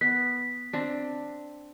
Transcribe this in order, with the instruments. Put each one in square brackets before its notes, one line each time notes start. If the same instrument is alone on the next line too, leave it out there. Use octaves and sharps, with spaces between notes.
[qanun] B3 [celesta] B6
[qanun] C4 D4